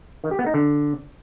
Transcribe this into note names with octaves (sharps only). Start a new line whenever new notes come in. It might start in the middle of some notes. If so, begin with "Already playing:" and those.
D#3
G4
B3
D#4
D3